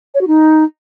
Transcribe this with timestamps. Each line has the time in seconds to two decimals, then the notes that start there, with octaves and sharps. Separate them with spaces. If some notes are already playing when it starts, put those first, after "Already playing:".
0.14 C#5
0.21 F#4
0.27 D#4